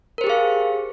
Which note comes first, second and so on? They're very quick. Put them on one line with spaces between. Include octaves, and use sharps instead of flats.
A#4 C5 G4 G#4 F5